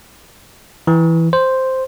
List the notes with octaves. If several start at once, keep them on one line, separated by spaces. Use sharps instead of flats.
E3
C5